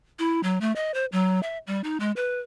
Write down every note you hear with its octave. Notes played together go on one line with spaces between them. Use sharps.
E4
F#3
A3
D#5
C5
F#3
E5
G3
D#4
G#3
B4